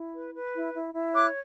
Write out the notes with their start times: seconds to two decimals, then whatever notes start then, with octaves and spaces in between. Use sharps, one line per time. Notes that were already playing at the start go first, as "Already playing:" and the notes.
Already playing: E4
0.14 B4
0.34 B4
0.54 E4
0.74 E4
0.93 E4
1.14 C#5 D6 F#6